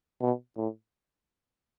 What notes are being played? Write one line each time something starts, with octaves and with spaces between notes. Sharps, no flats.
B2
A2